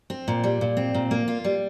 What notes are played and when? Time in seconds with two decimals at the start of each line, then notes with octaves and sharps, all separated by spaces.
0.10 C4
0.28 A#2
0.44 G3
0.61 A#2
0.77 C4
0.94 A#2
1.11 A#3
1.28 F4
1.44 G3